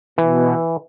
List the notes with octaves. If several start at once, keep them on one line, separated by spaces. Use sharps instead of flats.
B2 E3